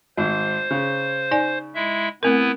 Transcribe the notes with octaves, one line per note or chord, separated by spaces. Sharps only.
G#1 C5
C#3
D#4 D5 G#5
G#3 E4 E5
A3 B3 C4 E4 A#4 B4